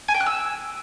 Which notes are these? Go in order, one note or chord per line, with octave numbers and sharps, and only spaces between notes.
G#5
G5
F#6
E6